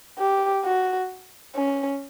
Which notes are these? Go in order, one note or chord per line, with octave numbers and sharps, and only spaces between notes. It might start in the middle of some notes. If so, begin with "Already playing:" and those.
G4
F#4
C#4